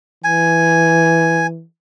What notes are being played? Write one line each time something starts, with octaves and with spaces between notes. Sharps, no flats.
E3 G#5